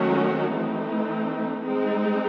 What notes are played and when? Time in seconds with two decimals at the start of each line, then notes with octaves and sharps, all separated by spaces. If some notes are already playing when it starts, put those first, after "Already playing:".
Already playing: D#3 F#3 A3 C#4 F#4
0.56 E3 A3 C4 D#4
1.64 G#3 C4 D#4